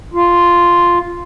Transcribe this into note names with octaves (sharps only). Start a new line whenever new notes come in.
F4